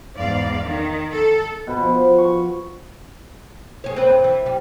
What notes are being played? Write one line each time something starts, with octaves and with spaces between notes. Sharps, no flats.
E2 G#2 D5 F5
D#3
A4
B2 B5
F3
C#6
G#4 C#5
C4 B4
G2
E3
G3